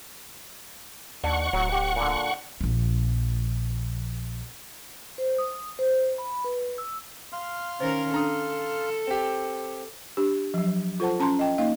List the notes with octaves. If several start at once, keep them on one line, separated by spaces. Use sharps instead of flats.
D#2 D4 F#5 C#6
D1 F#3
G4
A#2 D3
A#1 F3
C5
D#6
C5
B5
B4
E6
F5 C6 F6
D#3 C#4 A#4 C5
D4 A4 A#5 D#6
C4 G4
D4 G4
F3 F#3
F4 A4 C5 F#5 A5
C#4 A5 A#5 C6
D#5 G5
A#3 D#4 D#5 F5